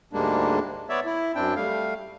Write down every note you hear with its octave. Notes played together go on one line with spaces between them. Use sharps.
D2 G#2 G3 G#3 A#3 D4
B3 C#5 D5 E5
E4
F#2 C4 D4 G5
G3 A3 F5